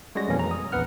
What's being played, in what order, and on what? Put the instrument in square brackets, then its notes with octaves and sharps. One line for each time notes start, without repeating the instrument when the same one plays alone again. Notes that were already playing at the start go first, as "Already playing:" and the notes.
[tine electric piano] G3 G#3 C#4 F#4 A#6
F2 B2 E3 A#3 C#4
A#5
D#6
A#1 E2 B4 F#5 F6